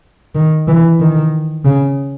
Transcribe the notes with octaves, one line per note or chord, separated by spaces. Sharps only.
D#3
E3
D#3
C#3